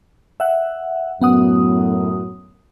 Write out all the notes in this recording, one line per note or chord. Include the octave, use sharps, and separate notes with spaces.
E5 F#5
F#2 A2 B3 F#5 D#6